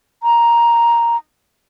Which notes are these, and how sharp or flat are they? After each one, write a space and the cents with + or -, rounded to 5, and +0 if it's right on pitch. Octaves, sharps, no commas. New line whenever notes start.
A#5 +5